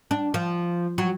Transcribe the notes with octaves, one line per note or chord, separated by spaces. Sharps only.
D4
F3
F#3